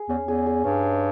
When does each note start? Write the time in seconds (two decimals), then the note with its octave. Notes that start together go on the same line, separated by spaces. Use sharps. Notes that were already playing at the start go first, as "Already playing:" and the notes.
Already playing: G#4
0.09 E2 C#4
0.24 E2 G#4
0.46 G#4
0.64 G2 C#4
0.83 D#5